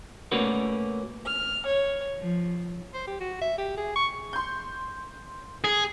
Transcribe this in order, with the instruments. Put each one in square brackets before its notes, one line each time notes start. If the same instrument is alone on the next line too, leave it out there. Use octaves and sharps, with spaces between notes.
[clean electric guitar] A3 A#3 C#4 F#4 A#4 B4
[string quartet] F6
C#5
F3
[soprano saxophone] C5
G4
F#4
E5
G4
G#4
C#6
[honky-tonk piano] C6 G6
[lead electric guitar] G#4